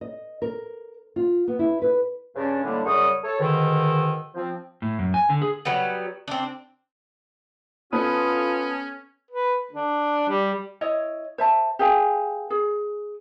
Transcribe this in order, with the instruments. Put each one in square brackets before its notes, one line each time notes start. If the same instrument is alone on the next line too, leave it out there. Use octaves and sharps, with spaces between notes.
[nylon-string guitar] D#5
A#4
F4
B3
E4
B4
[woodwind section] G2 C#3 C#4 D4
A2 D3 G3 G#3 A#3 D4
F#2 C#3 G3 C#6 D#6
A4 C#5
G#2 B2 D3 D#3
F3 C4
[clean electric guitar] A2
F#2
G#5
D3
G#4
[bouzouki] F#3 G3 B3
C4 D4
[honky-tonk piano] B3 A4 B4 [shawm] C#4 [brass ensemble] F4 [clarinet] D#6
[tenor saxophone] B4
D4
G3
[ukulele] E4 C#5 D#5
C5 E5 A5
G4 G#4 F5 G#5
G#4